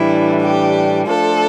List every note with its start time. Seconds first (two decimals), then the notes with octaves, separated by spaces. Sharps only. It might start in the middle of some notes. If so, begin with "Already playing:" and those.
Already playing: A2 E3 G3 D4 E4
0.40 G4
1.05 F3 A3 D4 F4 A4